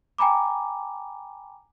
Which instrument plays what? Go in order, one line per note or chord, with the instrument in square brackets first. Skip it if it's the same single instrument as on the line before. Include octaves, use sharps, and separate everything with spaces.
[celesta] G5 G#5 A#5 B5 D6